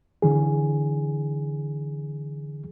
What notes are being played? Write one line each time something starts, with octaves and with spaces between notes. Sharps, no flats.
D3 E3 G#4